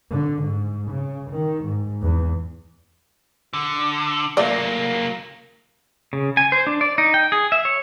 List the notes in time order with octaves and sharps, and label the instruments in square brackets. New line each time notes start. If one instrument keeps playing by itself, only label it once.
[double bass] D3
G#2
C#3
D#3
G#2
E2
[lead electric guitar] D3
[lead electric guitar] F#3 A#3 [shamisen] A3 F4 D5
[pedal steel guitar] C#3
G#5
C5
D4
D5
D#4
G5
G#4
E5
C#5